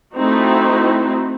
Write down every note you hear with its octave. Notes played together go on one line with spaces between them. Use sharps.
A3 C4 D#4 E4 F#4